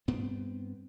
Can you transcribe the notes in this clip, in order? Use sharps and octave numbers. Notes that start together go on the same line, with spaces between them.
G2 B3 C4